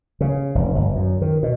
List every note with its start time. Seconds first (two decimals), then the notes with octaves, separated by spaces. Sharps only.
0.21 C#3
0.55 F1
0.76 G1
0.96 F#2
1.21 D#3
1.43 B2